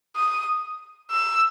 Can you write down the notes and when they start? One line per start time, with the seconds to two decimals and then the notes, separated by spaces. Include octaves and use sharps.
0.16 D#6
1.11 E6